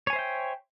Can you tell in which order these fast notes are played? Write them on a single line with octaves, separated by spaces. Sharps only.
C#5 G#5 C5 E5 G5